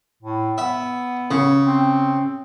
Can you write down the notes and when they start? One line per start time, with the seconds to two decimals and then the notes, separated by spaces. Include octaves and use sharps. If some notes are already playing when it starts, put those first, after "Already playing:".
0.23 A2
0.58 B3 E5
1.31 C#3
1.66 C4